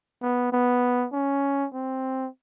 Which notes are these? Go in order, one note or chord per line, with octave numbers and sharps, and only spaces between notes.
B3
B3
C#4
C4